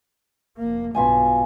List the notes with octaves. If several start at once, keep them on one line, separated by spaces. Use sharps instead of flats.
F1 A#3
B1 G2 B2 F4 G#5